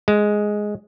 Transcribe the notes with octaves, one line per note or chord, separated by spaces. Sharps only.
G#3